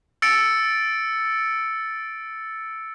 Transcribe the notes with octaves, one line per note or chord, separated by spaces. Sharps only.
E6 A6 C#7 D7